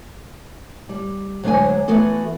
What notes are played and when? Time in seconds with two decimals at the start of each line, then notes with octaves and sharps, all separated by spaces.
0.89 G3
1.43 D2 F#3 G#3 D4 C5 G#5
1.88 E3 A3 B3 F#4 A4